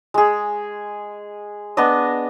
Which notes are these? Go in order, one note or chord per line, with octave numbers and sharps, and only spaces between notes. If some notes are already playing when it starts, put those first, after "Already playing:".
G#3 G#4
B3 D4 D#5